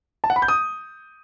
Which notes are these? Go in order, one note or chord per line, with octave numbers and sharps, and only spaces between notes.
A5
F#5
B5
G6
D#6